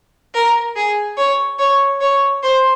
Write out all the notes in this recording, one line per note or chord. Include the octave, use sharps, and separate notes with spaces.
A#4
G#4
C#5
C#5
C#5
C5